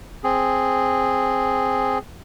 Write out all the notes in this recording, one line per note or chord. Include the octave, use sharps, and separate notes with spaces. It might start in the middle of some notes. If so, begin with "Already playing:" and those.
C4 G#4